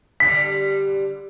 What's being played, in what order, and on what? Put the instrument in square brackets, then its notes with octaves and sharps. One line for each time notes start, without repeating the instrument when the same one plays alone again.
[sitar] D3 G3 [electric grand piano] B6